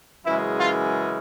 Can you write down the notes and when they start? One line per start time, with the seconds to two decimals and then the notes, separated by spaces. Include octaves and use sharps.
0.24 F#2 C#3 E3 G#3 E4
0.58 F4